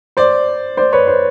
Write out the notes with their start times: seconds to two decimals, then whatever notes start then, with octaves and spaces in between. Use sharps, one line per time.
0.17 C5 D5
0.77 C5 D5
0.93 B4 C#5
1.08 C5